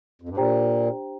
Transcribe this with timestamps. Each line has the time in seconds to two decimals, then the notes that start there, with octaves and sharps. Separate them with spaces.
0.22 F2
0.29 G2
0.37 A#2 D4 G4 C5 G5 A#5